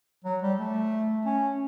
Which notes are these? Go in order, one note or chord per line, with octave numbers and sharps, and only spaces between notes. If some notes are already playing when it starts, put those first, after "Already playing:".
F#3
G3
A3
C#4